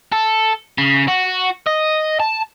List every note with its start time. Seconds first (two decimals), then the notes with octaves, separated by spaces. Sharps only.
0.12 A4
0.78 C#3
1.08 F#4
1.67 D#5
2.20 A5